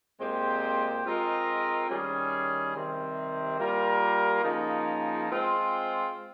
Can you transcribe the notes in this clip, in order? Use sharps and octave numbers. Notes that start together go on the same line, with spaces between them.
A#2 G#3 C4 G4 C5
G#3 C4 F4 A#4 D#5
D#3 G3 C#4 G#4
C3 D#3 G3 C4
G3 A#3 F4 A#4
C#3 F3 A#3 D#4
G#3 C4 F4 C5